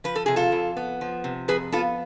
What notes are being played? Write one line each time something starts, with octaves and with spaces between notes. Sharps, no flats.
F3 B4
A4
C3 G#4
F4 A4
F2
B3
F3
C3
F2 G#4 B4
B3 F4 A4